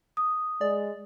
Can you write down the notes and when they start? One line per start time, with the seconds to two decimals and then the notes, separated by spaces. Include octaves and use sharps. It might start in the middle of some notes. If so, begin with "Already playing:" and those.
0.17 D#6
0.61 G#3 D5